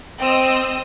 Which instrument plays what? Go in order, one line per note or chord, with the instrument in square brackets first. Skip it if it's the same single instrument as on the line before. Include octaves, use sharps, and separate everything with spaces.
[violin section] C4 D#5 D#6 E6